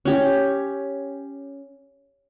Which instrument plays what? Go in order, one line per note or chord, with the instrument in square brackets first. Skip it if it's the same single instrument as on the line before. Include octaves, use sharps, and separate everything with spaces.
[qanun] C#4 G4